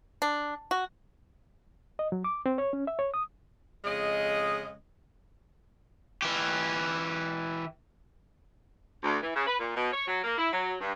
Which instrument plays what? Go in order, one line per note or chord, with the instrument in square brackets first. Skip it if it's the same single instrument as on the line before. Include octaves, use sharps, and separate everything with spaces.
[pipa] D4
F#4
[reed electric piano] D#5
F#3
D6
C4
C#5
C#4
E5
C#5
D#6
[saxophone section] F2 C#3 G#3 D#5
[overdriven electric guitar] E3 G4
[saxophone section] D2
E3
C#3
B4
A#2
B2
C#5
F#3
A#3
E4
F#3
G2